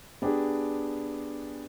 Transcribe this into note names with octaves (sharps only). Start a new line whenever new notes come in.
B3 D4 G4 G#4